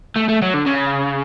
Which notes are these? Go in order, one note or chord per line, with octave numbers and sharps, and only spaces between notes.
A3
A3
F#3
D3
C#3